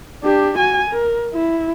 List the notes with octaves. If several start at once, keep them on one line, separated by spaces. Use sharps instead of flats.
D4 G4
F#4 G#5
A#4
E4